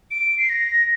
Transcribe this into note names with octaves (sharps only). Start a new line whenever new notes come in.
D7
C7
A#6